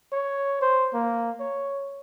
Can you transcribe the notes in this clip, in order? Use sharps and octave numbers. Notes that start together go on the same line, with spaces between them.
C#5
C5
A#3
C#5